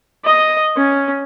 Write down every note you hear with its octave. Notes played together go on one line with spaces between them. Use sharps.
D#5
C#4